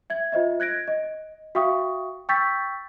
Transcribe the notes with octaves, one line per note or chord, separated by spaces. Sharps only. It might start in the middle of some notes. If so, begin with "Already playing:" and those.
E5 G#6
F4 C5 D#5 E5
F#6 G#6 A#6 D7
D#5
F#4 E5 F5 G5 C#6 D#6
G5 C#6 E6 G6 A6 B6